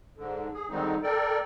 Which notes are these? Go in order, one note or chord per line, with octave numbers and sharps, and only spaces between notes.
G#2 D3
G#4
D3 D#3 G3 G#3 C4 D#4
A4 A#4 D5 G5